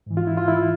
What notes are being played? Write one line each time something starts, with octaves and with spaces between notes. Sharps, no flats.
G#2 E3
F4
E4
F4
E4